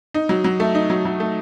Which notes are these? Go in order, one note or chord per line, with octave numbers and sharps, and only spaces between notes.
D#4
F#3
F#3
A3
D#4
F#3
F#3
A3